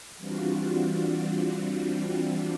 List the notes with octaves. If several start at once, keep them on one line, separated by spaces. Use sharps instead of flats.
E3 G3 C4 D4 F4 F#4